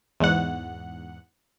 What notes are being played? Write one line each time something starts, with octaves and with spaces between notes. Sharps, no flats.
E2 G#2 F#5